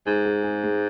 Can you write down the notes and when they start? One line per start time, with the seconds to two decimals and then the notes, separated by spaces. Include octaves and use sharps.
0.06 G#2 G#4
0.26 G#4
0.43 G#4
0.64 G#3